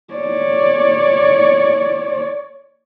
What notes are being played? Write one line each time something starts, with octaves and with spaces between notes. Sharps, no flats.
C#5 D5